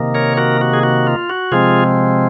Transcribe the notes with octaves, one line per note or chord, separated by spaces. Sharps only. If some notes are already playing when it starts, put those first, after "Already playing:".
Already playing: C3 D#3 A#3
A#4 C#5
F#4 A#4
F#4
G#4
F#4
F4
F#4
C3 F3 G#3 C4 F4 G#4